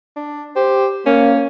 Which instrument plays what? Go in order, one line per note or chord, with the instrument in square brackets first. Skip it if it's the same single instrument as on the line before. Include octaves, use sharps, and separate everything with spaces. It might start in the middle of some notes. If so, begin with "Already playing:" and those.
[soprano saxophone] D4
[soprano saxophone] G4 [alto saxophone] C5
[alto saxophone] A#3 [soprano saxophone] C#4